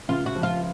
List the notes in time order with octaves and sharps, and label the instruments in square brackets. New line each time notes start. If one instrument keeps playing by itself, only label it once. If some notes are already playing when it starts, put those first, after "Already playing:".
[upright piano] C#2 [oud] F4
[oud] F#4
[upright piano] F3
[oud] F4